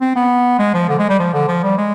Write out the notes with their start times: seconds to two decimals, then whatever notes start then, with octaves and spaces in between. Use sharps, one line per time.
0.01 C4
0.15 B3
0.59 G#3
0.74 F3
0.89 D3
0.99 G#3
1.09 G3
1.19 F3
1.34 D3
1.48 F3
1.64 G3
1.78 G#3